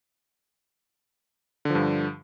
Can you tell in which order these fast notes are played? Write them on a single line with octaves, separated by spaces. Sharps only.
D3 F3 G2